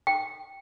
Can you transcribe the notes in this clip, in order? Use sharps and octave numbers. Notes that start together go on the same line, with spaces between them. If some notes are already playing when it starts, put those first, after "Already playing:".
G5